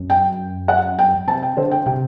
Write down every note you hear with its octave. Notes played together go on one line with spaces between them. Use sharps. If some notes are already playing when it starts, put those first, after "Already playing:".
Already playing: F#2
G5
F#5
G5
C3 A5
G5
D3 C5
G5
C3 G5